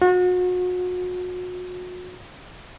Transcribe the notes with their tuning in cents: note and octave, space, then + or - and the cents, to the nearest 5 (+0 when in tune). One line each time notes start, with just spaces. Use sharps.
F#4 -35